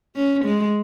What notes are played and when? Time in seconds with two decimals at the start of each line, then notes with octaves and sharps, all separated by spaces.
0.16 C#4
0.45 G#3